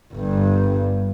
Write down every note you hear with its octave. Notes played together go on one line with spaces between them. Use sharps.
G1 G2